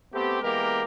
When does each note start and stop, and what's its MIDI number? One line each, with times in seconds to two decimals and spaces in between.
0.14 0.38 57
0.14 0.38 59
0.14 0.38 60
0.14 0.38 67
0.42 0.83 52
0.42 0.83 56
0.42 0.83 58
0.42 0.83 59
0.42 0.83 67
0.42 0.83 70